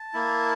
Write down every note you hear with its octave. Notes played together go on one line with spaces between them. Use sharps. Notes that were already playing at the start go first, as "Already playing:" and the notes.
Already playing: A5
A#3 E4